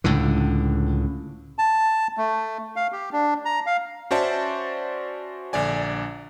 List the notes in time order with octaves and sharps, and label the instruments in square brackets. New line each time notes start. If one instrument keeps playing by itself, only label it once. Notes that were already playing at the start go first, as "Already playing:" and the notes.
[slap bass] C#2 A2 D3
[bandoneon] A5
A3
F5
G4
D4
A#5
F5
[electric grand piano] C#4 F#4 C5 D5 E5 A5
A#1 D3 D5 G#5